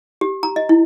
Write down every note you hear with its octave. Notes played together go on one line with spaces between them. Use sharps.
G4
A#5
D#5
E4